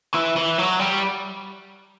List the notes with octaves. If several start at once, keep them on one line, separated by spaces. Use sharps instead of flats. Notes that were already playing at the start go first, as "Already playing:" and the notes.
E3
E3
F#3
G3